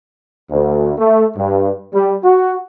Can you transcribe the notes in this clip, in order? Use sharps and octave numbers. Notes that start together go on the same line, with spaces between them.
D2
A3
G2
G3
F#4